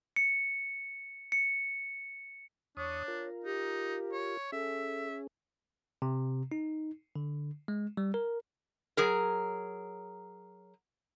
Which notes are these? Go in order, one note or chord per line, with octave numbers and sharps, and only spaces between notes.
C#7
C#7
E2 D4 C#5 C#6 D#6
F4 A#4
D#4 G4
C#5
C#4 G#4 A4 E5
C3
D#4
D3
G#3
G3
A#4
F#3 G#4 A#4